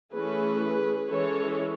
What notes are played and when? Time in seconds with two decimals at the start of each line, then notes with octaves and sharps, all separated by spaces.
0.14 E3 A3 C#4 G#4 B4
1.10 E3 G#3 C#4 A4 C#5